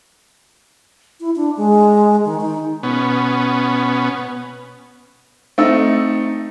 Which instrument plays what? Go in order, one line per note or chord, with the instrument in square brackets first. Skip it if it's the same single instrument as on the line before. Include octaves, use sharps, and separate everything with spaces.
[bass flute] E4
D4
G#3
D#3
D#4
[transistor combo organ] B2 B3 C#4
[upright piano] A3 C4 D#4 E6